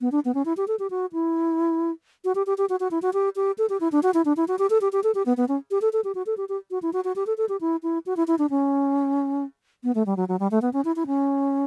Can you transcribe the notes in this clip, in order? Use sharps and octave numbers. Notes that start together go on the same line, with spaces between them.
B3
D4
B3
C#4
E4
G4
A4
G4
F#4
E4
F#4
G4
G4
G4
F#4
F#4
E4
F#4
G4
G4
A4
G4
E4
D4
F#4
E4
D4
E4
F#4
G4
A4
G4
G4
A4
G4
B3
B3
C#4
G4
A4
A4
G4
F#4
A4
G4
G4
F#4
E4
F#4
F#4
G4
A4
A4
G4
E4
E4
F#4
E4
E4
D4
C#4
B3
A3
G3
F#3
F#3
G3
A3
B3
C#4
E4
E4
C#4